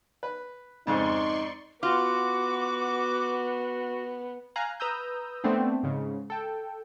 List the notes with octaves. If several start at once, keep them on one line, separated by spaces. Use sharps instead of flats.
B4
F2 G#2 C#3 D#4 D5 C6 C#6
B3 F4 F#4 D6
F5 G#5 A#5 F#6
B4 A#5 D#6 E6 G6
A3 B3 C4 D4
G#2 C#3
A4 G5